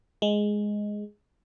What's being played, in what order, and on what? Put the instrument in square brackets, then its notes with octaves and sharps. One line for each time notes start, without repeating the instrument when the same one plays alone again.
[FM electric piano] G#3